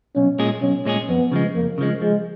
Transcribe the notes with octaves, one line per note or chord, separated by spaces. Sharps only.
B1 C#4
A#2 G#3 C#4 G#4
B1 C#4
A#2 G#3 C#4 G#4
F2 B3
C#3 F3 G#3
F2 A#3
C#3 F3 G#3
F3 G#3